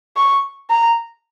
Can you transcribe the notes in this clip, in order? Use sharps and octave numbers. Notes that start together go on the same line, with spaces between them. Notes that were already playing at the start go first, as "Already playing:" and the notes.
C#6
A#5